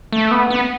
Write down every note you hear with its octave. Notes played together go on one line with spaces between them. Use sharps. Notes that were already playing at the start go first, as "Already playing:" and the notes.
A3
B3
B3